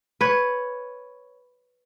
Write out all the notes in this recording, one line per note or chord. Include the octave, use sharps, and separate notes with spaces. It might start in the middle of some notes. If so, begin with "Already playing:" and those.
B4 C#5